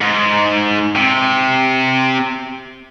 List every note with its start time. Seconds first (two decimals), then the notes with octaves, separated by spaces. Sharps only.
0.02 G#2
0.96 C3